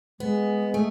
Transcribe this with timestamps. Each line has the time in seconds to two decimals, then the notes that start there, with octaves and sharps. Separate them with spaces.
0.20 G#3 B3
0.74 A3